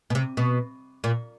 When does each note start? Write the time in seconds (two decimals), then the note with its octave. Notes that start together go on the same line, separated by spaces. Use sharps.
0.10 B2
0.15 C3
0.37 B2
1.04 A#2